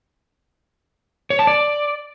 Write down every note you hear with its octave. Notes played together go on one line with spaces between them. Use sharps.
C#5
A5
D5